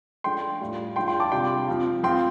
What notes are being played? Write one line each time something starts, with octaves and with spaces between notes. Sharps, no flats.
F3 A3 D4 F4 G5 C6
A2 G3 F4
F3 D4 F4 G5 C6
G5 C6
A5 D6
C3 G3 D4 F4 G5 C6
F3 C4 F4
F3 C4 F4 G5 C6